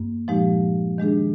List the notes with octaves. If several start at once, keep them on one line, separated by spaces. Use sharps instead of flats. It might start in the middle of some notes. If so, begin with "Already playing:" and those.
Already playing: G2 A#3
A#2 F3 G#3 D#4 G4
D#3 G#3 D4 G#4